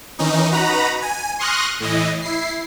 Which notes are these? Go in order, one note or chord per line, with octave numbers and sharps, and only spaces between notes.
D#3 E3 C#4 D#4
D#4 F#4 B4 A#5 B5
G#5
C6 C#6 D#6 F6 F#6 A#6
A2 E3 D#5
E4 C7